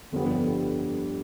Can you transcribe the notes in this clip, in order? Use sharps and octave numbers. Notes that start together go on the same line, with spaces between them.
G1 F2 D3 G3 B3